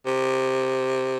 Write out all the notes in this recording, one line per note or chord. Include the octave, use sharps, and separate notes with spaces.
C3